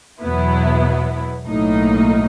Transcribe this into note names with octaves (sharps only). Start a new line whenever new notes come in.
E2 B2 F#3 B3 E4
B1 A2 F#3 A#3 D#4